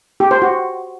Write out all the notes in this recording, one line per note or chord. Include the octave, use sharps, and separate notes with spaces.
G4
C5
F#4